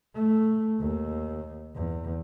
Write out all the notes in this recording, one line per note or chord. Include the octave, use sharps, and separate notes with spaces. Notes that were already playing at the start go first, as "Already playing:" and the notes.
A3
D#2
E2